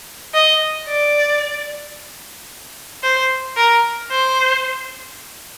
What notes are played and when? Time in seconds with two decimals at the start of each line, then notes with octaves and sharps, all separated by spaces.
0.34 D#5
0.88 D5
3.03 C5
3.57 A#4
4.11 C5